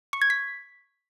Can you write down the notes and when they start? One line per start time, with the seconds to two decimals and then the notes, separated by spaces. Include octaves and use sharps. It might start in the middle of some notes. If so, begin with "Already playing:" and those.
0.13 C#6
0.22 G#6
0.30 B6